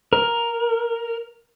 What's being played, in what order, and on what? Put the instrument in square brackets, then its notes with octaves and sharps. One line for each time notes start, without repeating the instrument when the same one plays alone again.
[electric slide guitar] A#4